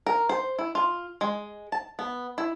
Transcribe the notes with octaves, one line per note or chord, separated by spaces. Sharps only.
A#4
C5
E4
F4
G#3
A5
B3
E4